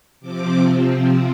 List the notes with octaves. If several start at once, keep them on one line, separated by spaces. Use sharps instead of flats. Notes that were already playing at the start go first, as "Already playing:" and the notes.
C3 F3 C4 D6